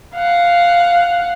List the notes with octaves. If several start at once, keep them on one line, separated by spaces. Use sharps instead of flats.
F5 F#5